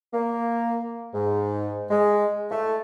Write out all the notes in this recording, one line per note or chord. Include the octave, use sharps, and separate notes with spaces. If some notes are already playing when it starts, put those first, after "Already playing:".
A#3
G#2
G#3
A3